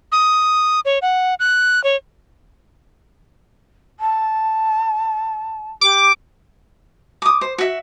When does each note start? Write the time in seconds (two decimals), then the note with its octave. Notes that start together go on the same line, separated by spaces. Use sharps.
0.12 D#6
0.85 C#5
1.02 F#5
1.40 F#6
1.84 C#5
3.99 A5
5.81 G4 D6
7.22 D6 D#6
7.41 C5
7.58 F#4 E5